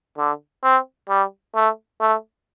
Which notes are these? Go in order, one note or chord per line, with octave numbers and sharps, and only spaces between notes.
D3
C4
G3
A3
A3